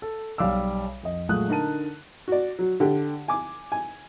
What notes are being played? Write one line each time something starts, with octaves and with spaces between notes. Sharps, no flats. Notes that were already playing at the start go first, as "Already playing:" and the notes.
A4
B1 G3 F5 D6 E6
F2 D#5
A#2 F#3 G#3 A3 D#6 F#6
D3 D#4 A#4 A5 D#7
F#4 D5
F#3
D3 G4
G#5 D6
G#5